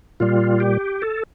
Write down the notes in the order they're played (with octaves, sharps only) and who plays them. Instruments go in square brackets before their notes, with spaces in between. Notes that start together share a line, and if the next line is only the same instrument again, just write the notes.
[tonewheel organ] A#2 G3 F4
G4
A4